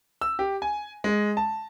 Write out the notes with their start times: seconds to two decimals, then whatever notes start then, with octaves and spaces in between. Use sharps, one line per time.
0.21 E6
0.39 G4
0.62 G#5
1.04 G#3
1.37 A5